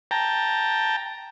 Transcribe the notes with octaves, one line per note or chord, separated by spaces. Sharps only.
G5 A5 A#5